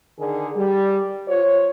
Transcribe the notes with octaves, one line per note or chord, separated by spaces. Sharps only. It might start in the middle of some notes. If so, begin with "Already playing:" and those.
D3 D#3 G#4
G3
F4 C5 C#5